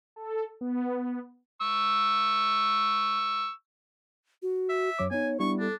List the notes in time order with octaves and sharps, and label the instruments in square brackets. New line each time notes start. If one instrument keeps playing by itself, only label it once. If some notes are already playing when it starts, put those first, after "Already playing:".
[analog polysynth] A4
B3
[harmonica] C#6 E6
[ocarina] F#4
[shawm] E5
[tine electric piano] F#2 F#3 D6 [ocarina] C#5
[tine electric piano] B3 D#4 [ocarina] C#5 [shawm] G#5
[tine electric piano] G3 B3 E4 [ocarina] D4 [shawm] C#6
[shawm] D4 [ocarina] A4